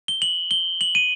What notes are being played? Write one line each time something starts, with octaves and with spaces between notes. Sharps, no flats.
G7
F#7
G7
F#7
D#7